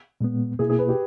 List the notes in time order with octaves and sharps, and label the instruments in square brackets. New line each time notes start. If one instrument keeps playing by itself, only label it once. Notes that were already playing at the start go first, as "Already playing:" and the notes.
[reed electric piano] A#2 G#3 B3
[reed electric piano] B2 A#3 E4 [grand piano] G#4
[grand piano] G#4
B4
G4